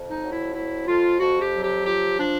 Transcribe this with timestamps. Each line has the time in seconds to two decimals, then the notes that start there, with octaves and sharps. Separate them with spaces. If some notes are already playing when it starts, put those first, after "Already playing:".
Already playing: F2
0.11 D#4
0.22 F#3
0.32 E4
0.54 F2 E4
0.87 F2 F4
1.20 F2 F#4
1.41 G4
1.52 F#3
1.64 G4
1.85 F3 G4
2.18 F3 D4